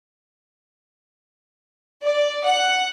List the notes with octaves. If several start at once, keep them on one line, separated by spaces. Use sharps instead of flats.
D5
F#5